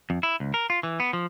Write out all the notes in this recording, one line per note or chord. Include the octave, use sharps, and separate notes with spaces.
F2
E4
C#2
A#4
F4
E3
B3
F3